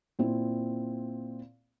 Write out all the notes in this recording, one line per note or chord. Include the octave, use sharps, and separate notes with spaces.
A#2 C4 E4